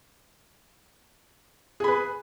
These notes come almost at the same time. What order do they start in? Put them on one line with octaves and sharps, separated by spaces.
G#4 B5 B4